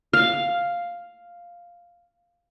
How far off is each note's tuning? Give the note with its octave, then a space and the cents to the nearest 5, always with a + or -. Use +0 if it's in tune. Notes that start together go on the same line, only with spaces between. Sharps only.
F5 +0